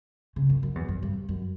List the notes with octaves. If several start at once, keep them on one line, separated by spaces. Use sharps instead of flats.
C#3
F#2
F#2
E2
F#2
G2
F#2